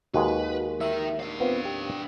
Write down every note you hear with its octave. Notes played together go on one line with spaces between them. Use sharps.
D#2 G#3 F#4 B4
D#4 A#4 E5
D4 F5
B3 C4 F4
G4